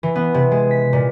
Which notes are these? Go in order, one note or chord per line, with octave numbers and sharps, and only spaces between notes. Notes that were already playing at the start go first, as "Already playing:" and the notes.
E3
B3
C3
G#3
B6
A#2